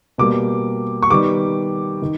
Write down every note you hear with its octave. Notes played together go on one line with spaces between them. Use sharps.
B2 G3 A#3 D6
C#6
D#3 G3 B3 D6
D#3